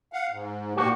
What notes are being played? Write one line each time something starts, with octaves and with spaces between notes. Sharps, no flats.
F5 F#5
G#2
A#2 A#3 F#4 G4